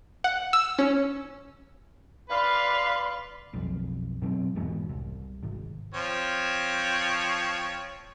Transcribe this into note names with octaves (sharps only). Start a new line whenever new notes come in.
F#5
E6
C#4
B4 D5 F5 C6
B1 F2
B2 F#3 B3 C4
D#1 E2 G#2 B2
C2
G#1
F3 C4 C#5